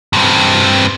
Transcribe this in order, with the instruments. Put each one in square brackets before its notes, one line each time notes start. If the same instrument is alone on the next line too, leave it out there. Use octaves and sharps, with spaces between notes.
[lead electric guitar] G2 C4